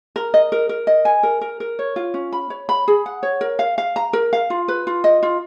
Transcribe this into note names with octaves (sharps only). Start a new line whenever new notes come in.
A#4
D#5
A#4
A#4
D#5
G#5
A#4
A#4
A#4
C#5
F4
C#4
B5
C#5
B5
G#4
F#5
C#5
A#4
F5
F5
A#5
A#4
F5
F4
B4
F4
D#5
F4